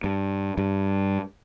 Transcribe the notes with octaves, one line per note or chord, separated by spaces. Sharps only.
G2
G2